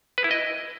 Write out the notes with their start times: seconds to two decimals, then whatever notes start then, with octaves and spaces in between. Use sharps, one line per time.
0.18 B4
0.24 E4
0.31 D#5